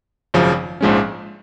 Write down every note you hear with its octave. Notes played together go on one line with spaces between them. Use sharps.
G#1 F#2 C#3 F3
A#1 G#2 F3 G#3 C#4